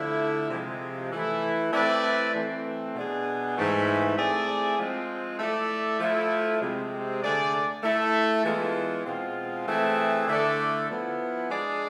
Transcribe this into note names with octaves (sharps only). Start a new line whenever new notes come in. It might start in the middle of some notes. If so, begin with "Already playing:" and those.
Already playing: D3 F3 A3 E4
C3 F3 G#3
E3 A3 E4
A3 C4 E4 B4 D5
E3 A3 C4
B2 B3 D4 G#4
G#2 E3 A3
A3 C4 E4 G#4 D5
F3 G#3 C4
A3 E4 A4 D5
F3 A3 E4
C3 G#3 C4
D3 A3 D4 G#4 D5
A3 E4 A4
E3 G#3 B3 F4
B2 G#3 C4 F4
E3 A3 C4 E4 G#4
D3 A3 E4 A4 D5
F3 B3 E4
G#3 D4 G#4 D5